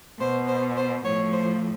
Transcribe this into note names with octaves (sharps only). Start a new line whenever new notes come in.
B2 C5
C5
C5
A2 F3 C#5
C5